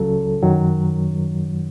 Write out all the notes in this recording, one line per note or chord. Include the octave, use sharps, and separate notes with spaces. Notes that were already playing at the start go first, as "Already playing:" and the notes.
Already playing: C#2 C#3 F#3 A4
F#2 D#3 F#3